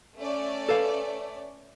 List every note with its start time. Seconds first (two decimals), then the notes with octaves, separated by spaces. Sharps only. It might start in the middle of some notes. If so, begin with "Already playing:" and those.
0.18 A3 C#4 D5
0.69 A4 B4 F5